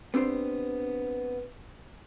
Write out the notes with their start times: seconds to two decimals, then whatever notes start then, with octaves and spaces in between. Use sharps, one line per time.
0.14 B3 C4 D4 G4 C5